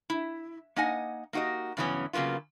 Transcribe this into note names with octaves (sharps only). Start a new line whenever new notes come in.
E4
A#3 D#4 D#5 F#5 G#5
A#3 D#4 F#4 G4 D#5
G2 C#3 E3 F#3 B3 C#4
C#3 F#3 A#3 B3 F4